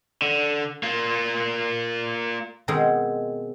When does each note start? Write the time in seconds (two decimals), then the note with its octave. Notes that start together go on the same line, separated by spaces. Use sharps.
0.22 D3
0.83 A#3 F4
2.68 B2 D#3 G#3 C4